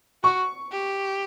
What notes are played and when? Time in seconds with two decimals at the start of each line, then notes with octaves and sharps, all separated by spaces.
0.24 F#4 C#6
0.72 G4